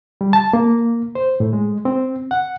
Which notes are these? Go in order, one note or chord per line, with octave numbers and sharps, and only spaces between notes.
G3
A5
A#3
C5
A2
G#3
C4
F#5